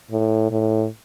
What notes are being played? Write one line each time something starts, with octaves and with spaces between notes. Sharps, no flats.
A2
A2